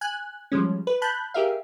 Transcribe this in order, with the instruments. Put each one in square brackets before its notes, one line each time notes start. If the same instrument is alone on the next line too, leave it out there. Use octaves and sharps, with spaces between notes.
[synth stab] G#5 F#6
F3 G3 G#3 C#4
B4
A5 B5 F#6 G6
G4 G#4 A#4 E5 F5